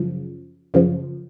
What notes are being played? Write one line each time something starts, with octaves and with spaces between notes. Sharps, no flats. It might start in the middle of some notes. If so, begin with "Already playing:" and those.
Already playing: F#2 C#3 F3
F#2 C#3 F3